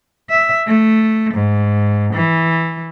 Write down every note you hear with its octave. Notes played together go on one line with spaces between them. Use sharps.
E5
A3
G#2
E3